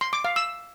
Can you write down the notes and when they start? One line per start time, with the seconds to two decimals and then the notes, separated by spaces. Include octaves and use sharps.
0.01 C6
0.13 D6
0.25 F5
0.36 E6